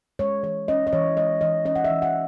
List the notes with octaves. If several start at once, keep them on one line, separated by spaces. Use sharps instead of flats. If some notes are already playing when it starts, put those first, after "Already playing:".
G#3 C#5
E3 C#5
C#4 D#5
D#5
E3 C#5
G#3 D#5
E3 D#5
C#4 D#5
F#5
E5
E3
F#5